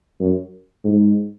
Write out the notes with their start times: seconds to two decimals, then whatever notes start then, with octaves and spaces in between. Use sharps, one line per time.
0.20 F#2
0.85 G#2